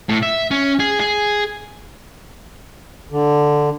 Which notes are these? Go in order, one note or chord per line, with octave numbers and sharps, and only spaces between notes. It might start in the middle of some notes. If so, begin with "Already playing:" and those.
A2
E5
C#4
G#4
G#4
D3